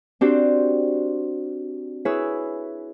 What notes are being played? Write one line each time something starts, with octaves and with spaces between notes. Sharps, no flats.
C4 D4 F#4 G4 C5
E4 G#4 B4 C#5 E6